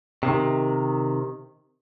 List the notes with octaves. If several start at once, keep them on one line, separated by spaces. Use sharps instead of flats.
C3 D#3